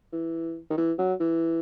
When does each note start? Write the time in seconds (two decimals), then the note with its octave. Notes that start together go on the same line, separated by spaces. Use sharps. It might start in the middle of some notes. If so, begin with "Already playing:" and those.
0.12 E3
0.70 D#3
0.77 E3
0.98 F#3
1.20 E3